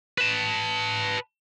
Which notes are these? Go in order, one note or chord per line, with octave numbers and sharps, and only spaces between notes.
B4 A5